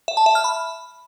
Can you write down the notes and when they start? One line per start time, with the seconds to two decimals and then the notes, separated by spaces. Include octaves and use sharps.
0.08 E5
0.17 A5
0.26 E5
0.35 F6
0.44 B5